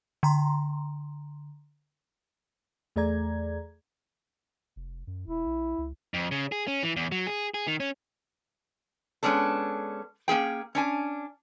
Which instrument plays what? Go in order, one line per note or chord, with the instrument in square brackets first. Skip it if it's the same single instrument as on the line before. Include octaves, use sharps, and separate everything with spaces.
[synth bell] D3 A#5 C6
[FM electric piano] E2 A3 G#4 D5 A#5 G#6
[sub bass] F1
F#2
[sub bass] E1 [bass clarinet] E4
[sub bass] A#1
C#2
[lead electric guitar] F2
C#3
G#4
C#4
E3
E2
F#3
G#4
G#4
D#3
C#4
[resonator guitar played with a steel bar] G#3 B3 C#4 D4 A4
A#3 C#4 G#4 G5
C#4 D4 G#5